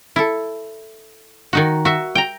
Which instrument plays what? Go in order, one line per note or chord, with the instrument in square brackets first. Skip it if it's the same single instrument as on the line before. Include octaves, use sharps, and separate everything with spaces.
[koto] E4 A4
D#3 D#4 F#4
F#4 E5
G5 A#5